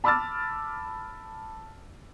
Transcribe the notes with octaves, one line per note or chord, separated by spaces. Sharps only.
A5 B5 D6 E6 F6 A6